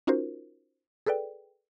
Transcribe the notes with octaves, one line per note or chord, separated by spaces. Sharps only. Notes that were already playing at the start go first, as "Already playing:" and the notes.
C#4 D#4 F4 F#4 A#4 C5
G#4 A4 B4 D5 G5